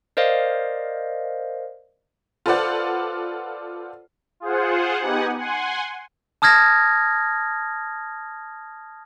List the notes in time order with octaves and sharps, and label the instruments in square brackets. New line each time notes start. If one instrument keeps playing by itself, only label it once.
[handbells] A#4 C5 D5 D#5 F5
[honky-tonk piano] F4 A4 B4 C5 D5 F#5
[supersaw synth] F4 G#4 C5 F#5
B3 D#4 G4 F#5 G#5
F#5 G#5 C6
[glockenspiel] A5 D#6 F6 G#6 A#6